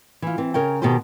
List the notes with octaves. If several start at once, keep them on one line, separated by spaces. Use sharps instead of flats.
E3 F4
E3 C4
C#3 A#4 C#5 G5
B2 D#3 G4 G#4 C5